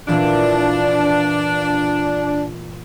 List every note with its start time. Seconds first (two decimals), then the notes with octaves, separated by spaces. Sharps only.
0.08 A#2 E3 C4 D4